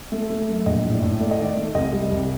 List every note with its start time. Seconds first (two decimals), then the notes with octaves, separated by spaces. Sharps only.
0.12 A3
0.30 A3
0.48 F#2
0.66 A#1 D#5
0.84 A2
0.93 D5
1.02 A2
1.20 A3 D5
1.31 D#5
1.39 D#3 D5
1.56 A3
1.75 C2 D#5
1.93 G3
2.12 C2